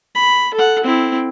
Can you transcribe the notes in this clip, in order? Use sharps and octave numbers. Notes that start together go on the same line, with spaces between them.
B5
A4 F#5
C4 E4